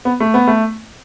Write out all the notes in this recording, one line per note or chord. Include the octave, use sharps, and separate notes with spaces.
B3
A3
B3
A3